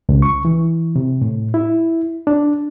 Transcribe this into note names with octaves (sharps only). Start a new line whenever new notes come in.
C#2
C#6
E3
C3
A2
E4
D4